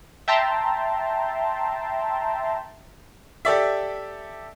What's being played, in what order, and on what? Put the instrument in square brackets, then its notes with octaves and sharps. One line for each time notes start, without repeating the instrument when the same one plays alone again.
[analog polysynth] E5 G5 A5 A#5 C6
[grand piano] G4 A4 D5 E5